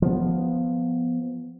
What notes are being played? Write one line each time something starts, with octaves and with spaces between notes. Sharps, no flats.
F3 B3